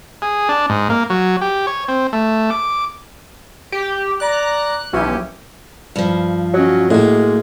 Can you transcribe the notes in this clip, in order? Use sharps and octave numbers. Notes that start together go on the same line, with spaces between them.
G#4
D4
G#2
A#3
F#3
G4
C#5
C4
A3
D6
G4
D5 A#5 F#6
B1 E3 C#4 G4
G2 F3
F#3 C#4 D#5
A2 F#3 G#3 A#3